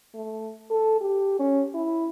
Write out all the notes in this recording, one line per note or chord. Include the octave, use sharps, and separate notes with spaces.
A3
A4
G4
C#4
E4